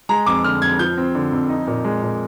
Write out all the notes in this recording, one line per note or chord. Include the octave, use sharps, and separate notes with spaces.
G#3 A#5
F2 D6
D3 F6
F2 G#6
F3 G6
C4
D3
F2
D#4
A#2
G#3
A#2